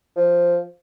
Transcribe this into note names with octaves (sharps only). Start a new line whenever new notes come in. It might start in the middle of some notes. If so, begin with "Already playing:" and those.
F3